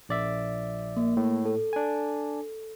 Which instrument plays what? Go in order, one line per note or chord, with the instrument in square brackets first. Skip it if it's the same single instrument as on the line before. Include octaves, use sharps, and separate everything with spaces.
[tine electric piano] A#1 D5 E5
[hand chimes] A#3
[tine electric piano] A2
[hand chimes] A4
[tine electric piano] D4 G#5